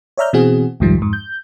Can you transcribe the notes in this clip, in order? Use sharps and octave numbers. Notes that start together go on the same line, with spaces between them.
C#5 D5 E5 A#5 F6 G6
B2 E3 C4 F#4 G#4
C2 F2 G#2 D#3 F3 G3
F2 G#2
G6